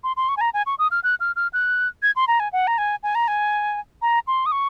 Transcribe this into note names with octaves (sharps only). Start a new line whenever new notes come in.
C6
C6
C#6
G#5
A#5
G#5
C#6
D#6
F6
F#6
F6
F6
F#6
G#6
C6
A#5
G#5
F#5
A#5
G#5
G#5
A#5
G#5
A#5
C6
D#6
C#6